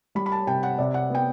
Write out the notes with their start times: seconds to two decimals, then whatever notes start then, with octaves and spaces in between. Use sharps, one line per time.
0.15 G3 B5
0.26 B5
0.32 A5
0.47 C3 G5
0.63 F#5
0.78 C3 D5
0.94 F#5
1.10 B3 G5